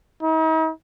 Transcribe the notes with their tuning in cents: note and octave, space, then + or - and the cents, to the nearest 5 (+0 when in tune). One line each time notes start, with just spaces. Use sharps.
D#4 +45